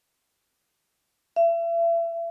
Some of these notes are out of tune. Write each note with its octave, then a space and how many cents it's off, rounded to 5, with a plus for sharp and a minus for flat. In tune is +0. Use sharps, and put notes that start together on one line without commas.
E5 +35